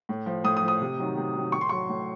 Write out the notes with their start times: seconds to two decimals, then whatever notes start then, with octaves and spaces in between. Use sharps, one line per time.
0.09 A2
0.26 F3
0.44 A2 D#6
0.57 D#6
0.63 F3
0.68 D#6
0.81 C3
0.99 D#3 F#3
1.17 C3
1.35 D#3 F#3
1.52 A2 C#6
1.61 C6
1.69 F#3 C#6
1.89 A2